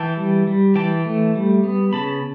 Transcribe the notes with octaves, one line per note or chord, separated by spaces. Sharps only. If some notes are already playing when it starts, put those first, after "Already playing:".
Already playing: E3 G5 A5
G3
G3
E3 G5 A5
A3
G3
B3
C#3 A5 B5